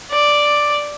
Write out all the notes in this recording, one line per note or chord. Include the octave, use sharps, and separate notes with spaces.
D5